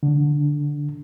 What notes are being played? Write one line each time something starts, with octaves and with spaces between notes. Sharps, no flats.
D3